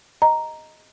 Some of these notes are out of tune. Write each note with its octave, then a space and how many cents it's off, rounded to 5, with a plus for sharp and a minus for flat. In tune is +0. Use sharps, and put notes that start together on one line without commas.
D#5 +0 A#5 +0